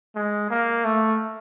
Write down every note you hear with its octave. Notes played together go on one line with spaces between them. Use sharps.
G#3
A#3
A3